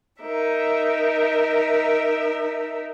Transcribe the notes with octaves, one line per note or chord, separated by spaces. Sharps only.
D#4 A#4 E5